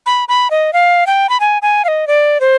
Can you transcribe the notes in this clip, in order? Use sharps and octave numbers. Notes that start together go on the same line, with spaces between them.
B5
B5
D#5
F5
G5
B5
G#5
G#5
F5
D#5
D5
C5